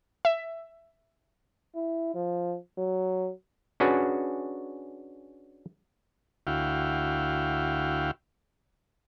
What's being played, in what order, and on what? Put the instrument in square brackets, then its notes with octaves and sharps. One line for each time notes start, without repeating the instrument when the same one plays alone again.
[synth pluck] E5
[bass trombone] E4
F3
F#3
[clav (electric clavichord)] C#4 D4 F#4 G#4 B4
[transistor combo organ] D2 E4 F#4 F5 G5